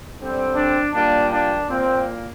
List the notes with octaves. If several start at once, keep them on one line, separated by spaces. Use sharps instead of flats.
D3 G3 C4
D4
A#2 G3 A#3 D4
D4
A#2 A#3 C4